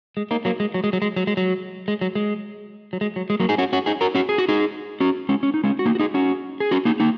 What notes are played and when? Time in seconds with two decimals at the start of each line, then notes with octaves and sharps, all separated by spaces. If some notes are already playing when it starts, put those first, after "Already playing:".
0.17 G#3
0.31 A#3 D#4
0.45 F#3 A#3
0.60 G#3
0.74 F#3
0.84 G#3
0.93 F#3
1.02 G#3
1.16 F#3
1.27 G#3
1.37 F#3
1.88 G#3
2.01 F#3
2.15 G#3
2.93 F#3
3.01 G#3
3.16 F#3
3.30 G#3
3.40 F#3 A#3
3.49 D#4 G#4
3.58 C#4 F#4
3.73 C#4 F#4
3.86 D#4 G#4
4.01 F#4 A#4
4.15 C#4 F#4
4.29 G#4
4.38 F#4
4.49 D#4 G#4
5.01 C#4 F#4
5.29 G#3 C#4
5.43 C#4
5.54 D#4
5.64 G#3 C#4
5.79 F#4
5.86 A#3 D#4
5.95 F#4
6.00 D#4 G#4
6.14 C#4 F#4
6.60 G#4
6.71 C#4 F#4
6.85 A#3 D#4
7.00 A#3 D#4